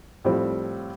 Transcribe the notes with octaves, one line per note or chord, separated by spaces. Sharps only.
A2 F3 G3 C4